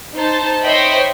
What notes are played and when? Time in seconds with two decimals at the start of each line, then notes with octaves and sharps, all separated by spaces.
0.16 D#4 C5 A5
0.64 C5 C#5 D#5 E5 G5 B5